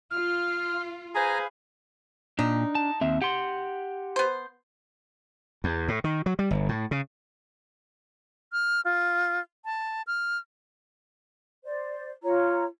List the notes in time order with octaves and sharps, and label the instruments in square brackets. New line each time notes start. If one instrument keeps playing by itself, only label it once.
[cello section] F4 [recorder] F6
[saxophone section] G#4 B4 C5 [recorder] F5 [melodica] G#5 A#5
[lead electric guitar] A#2 [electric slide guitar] D4 [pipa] D#4
[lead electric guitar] A5
[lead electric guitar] D#2 [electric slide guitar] C4 E5
[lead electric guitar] G4 C6 [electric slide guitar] F#5
[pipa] B3 C5
[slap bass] E2
A2
D#3
F#3
G3
G1
A2
C#3
[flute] F6
F4
A5
F6
[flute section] C5 D5
[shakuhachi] F4 [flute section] C#5 A#5